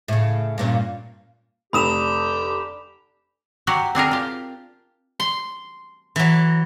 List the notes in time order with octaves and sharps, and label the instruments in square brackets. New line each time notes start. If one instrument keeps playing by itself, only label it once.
[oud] A2 C#3
G2 A#2 C#4
[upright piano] F1 D#6 [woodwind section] D3 G4 [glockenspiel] B5 E7 F7
[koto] F#3 F#4 G4
C4 D4 G#4 A#4
F4 G4
[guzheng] C6
E3 F#3